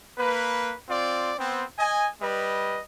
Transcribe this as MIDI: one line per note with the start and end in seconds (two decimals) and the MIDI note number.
0.18 0.73 58
0.18 0.73 71
0.88 1.32 60
0.88 1.32 65
0.88 1.32 74
1.38 1.64 59
1.38 1.64 60
1.78 2.08 75
1.78 2.08 80
2.22 2.80 55
2.22 2.80 71
2.22 2.80 75